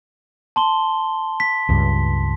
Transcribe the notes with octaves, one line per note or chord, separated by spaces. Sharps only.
A5 C6 G7
B6
C#2 G2